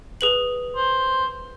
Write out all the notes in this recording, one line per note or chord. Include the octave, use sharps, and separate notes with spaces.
G#4 B4 F#7
C5